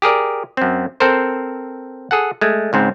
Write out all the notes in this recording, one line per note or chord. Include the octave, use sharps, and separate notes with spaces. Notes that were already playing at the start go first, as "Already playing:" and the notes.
G4 G#4 A#4 D5
F#2 C4
C4 A4 A#4 C5
G#4 A4 F#5
G#3 A3
C#2 G#2 C4